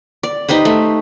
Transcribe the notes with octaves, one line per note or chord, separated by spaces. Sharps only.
D5
D#4 G4 B4 C5
A3